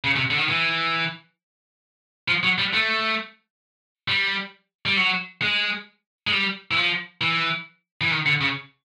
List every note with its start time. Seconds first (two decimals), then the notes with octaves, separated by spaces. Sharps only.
0.04 C#3
0.16 C3
0.31 D3
0.38 D#3
0.49 E3
2.28 F3
2.43 F#3
2.58 G3
2.73 A3
4.08 G3
4.86 G3
4.97 F#3
5.42 G#3
6.27 G#3
6.32 G3
6.71 E3
6.76 F3
7.21 E3
8.01 E3
8.11 D#3
8.26 D3
8.41 C#3